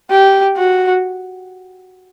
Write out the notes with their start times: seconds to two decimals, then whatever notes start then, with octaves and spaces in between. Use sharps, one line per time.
0.10 G4
0.57 F#4